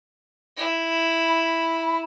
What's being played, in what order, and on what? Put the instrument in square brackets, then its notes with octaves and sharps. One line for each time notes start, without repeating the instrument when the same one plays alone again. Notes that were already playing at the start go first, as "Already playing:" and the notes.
[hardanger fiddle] E4
[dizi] B5